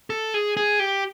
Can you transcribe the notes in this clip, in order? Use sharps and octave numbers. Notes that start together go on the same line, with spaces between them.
A4
G#4
G#4
G4